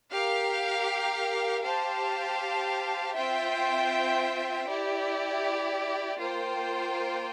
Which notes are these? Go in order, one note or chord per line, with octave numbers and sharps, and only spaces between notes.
G4 A#4 F5
G4 C5 F5 A5
C4 F4 C5 E5 G5
E4 G4 D5
A#3 F4 C5 G5